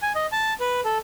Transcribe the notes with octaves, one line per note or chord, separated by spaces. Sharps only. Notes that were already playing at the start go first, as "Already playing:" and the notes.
G#5
D#5
A5
B4
A4